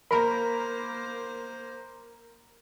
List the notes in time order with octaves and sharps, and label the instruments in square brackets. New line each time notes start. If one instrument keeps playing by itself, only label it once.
[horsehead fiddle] A#3 C5 [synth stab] A#4 [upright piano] A#5 B5